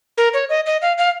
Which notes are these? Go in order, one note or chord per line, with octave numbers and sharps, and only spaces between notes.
A#4
C#5
D#5
D#5
F5
F5